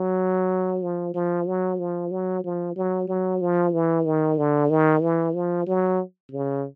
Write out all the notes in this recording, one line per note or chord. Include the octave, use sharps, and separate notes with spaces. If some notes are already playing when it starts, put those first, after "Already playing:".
Already playing: F#3
F3
F3
F#3
F3
F#3
F3
F#3
F#3
F3
E3
D#3
D3
D#3
E3
F3
F#3
C#3